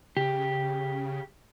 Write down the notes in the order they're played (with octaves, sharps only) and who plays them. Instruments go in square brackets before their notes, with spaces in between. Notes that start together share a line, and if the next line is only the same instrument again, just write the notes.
[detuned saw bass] C#3 [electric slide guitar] G4